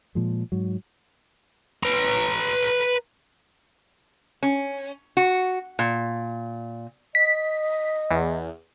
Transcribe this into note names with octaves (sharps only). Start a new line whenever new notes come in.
A#2 F3 G#3
G#2 F#3
B4 A#5
C#4
F#4
A#2
D#5 B6
E2